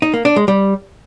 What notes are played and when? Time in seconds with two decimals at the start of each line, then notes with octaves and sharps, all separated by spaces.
0.02 D#4
0.14 A#3
0.25 D4
0.36 G#3
0.48 G3